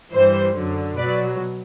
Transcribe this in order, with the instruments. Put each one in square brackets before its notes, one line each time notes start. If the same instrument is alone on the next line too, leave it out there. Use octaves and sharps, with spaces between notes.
[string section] G2 E3 G3 C5
F#2 D3 F#3
B2 F#3 B4 D5